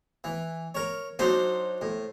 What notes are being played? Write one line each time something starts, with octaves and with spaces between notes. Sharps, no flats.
E3
A#4 C#5
F#3 D4 D#4 C5
A2